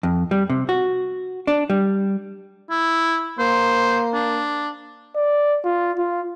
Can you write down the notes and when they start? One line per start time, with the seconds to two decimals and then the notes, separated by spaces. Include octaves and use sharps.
0.03 F2
0.31 G3
0.50 C3
0.69 F#4
1.47 D4
1.70 G3
2.70 E4
3.39 A#3 C5
4.14 D4
5.16 D5
5.65 F4
5.98 F4